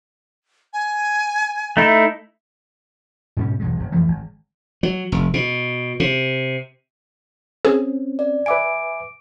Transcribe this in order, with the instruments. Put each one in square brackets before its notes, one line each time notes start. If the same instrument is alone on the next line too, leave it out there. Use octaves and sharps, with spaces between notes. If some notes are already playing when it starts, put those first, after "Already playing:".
[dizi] G#5
[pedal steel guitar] A3 D#4 E4
[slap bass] G#2 B2 G3 C#4
E1 B1 G#3
F#1
F2 E3 F3 A3
G#1
F#3
F1
B2
C3
[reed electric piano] C4 C#4 [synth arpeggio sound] G#4
[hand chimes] D5
[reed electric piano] B4 E5 G#5 [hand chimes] D6 D7